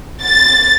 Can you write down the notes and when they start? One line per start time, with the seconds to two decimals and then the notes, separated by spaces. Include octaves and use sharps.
0.24 A6